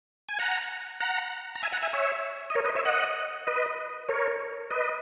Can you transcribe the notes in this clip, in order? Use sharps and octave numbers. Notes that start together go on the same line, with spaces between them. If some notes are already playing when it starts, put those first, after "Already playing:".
G#5
F#5 A#5
F#5 A#5
A#5
E5 G#5
F#5 A#5
E5 G#5
C#5 E5
D#5
A#4 C#5
B4 D#5
C#5 E5
D#5 F#5
B4 D#5
A#4 C#5
B4 D#5